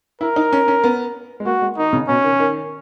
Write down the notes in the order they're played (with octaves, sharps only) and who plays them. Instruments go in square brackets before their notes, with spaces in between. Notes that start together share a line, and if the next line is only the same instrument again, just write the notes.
[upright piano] E4 [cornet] A#4
[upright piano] D#4
C#4
C#4
B3
G#3
[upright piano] A#3 [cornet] F#4
[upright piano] G#3
[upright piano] D#3 [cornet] D#4
[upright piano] C#3
[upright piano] B2 [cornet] C#4
[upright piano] D#3
D#3